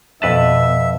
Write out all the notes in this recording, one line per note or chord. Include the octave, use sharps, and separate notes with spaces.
F2 B2 B4 E5 A5